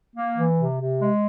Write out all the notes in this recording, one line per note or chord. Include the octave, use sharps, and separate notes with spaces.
A#3
E3
C3
C3
G#3